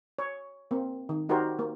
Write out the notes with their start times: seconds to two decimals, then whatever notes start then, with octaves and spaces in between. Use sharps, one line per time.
0.19 C#5
0.71 A#3 C4
1.09 D#3
1.29 D#4 F#4 G4 A#4 C5
1.59 A#3